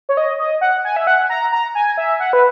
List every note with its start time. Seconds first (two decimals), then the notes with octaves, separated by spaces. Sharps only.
0.09 C#5
0.17 D#5
0.39 D#5
0.61 F#5
0.85 G#5
0.96 E5
1.07 F#5
1.30 A#5
1.52 A#5
1.75 G#5
1.97 E5
2.20 F#5
2.33 B4